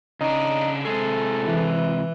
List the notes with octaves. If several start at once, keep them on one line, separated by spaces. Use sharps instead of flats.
C#3 D4 D#4
C3 G#3 G#4 A4
E3